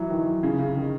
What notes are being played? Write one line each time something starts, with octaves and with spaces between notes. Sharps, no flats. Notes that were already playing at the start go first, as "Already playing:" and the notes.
Already playing: E3 F#3
D#3
C#3
C#3
D#3